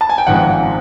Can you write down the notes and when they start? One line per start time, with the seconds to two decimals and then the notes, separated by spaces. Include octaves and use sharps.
0.01 A5
0.09 G#5
0.18 G5
0.27 G#1 G#2 F3 G#3 F#5